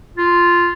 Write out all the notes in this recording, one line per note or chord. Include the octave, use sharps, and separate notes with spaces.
F4